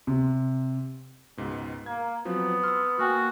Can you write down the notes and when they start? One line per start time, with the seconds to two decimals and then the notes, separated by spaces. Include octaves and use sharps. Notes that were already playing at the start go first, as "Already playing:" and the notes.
0.07 C3
1.37 C#2 G#2 B2
1.86 A#3 G#6
2.25 F3 F#3 B3 C4
2.63 C6 E6 F6
2.99 A#3 F#4 G5 G#5 F6